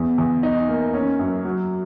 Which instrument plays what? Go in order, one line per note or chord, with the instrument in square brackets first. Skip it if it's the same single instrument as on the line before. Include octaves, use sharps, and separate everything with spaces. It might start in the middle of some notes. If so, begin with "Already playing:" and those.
Already playing: [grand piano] E2
E2
D#4
A#3
C#4
F#2
F#3